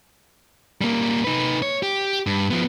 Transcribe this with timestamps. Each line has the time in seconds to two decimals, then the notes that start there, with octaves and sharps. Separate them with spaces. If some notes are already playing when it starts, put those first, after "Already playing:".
0.81 G3 A#3
1.24 D#4 B4
1.62 C#5
1.83 G4
2.27 G2
2.50 F3 B3